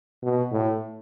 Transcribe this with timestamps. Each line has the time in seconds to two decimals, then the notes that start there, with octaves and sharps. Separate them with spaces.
0.23 B2
0.52 A2